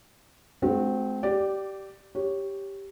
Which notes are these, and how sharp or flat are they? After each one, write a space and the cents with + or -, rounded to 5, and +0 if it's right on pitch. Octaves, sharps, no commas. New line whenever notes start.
G#3 +35 C4 -15 F#4 -30
G4 -15 D5 +5
G4 +0 C#5 +0